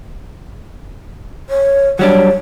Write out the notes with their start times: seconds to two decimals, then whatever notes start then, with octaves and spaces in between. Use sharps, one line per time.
1.50 C#5
1.99 F#3 G3 D4 C#5